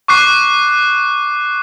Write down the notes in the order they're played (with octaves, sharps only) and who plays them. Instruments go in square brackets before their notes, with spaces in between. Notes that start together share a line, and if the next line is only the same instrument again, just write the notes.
[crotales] C#6 D6 F#6 C7